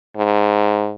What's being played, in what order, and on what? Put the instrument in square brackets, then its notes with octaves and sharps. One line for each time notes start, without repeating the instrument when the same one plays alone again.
[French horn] G#2